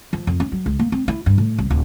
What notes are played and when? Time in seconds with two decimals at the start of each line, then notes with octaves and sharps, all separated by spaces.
0.13 F3
0.27 F2
0.40 C#4
0.52 F#3
0.66 C#2
0.79 A#3
0.92 C4
1.08 E4
1.26 G2
1.38 A2
1.58 C2
1.70 D1